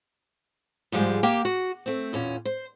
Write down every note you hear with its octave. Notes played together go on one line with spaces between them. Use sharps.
G#2 F3 G3 G#3
A#3 G4 G5
F#4
A3 C4
E2 A#2 C#4
C5